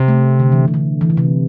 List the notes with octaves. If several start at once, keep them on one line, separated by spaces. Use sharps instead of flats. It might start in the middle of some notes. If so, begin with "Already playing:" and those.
Already playing: C3
A3
D3
E3
C3
D3
E3
D3
C3